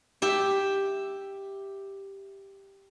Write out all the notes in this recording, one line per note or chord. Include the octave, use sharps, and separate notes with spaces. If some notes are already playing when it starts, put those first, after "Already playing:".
G4 E5